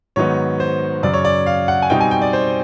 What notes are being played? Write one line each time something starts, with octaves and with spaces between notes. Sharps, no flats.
G#2 D#3 F#3 B3 D#4 C#5
C5
F#2 C#3 F#3 D5
C#5
D5
F5
F#5
G#5
B2 G3 C4 D#4 G5
G#5
G5
D5
C5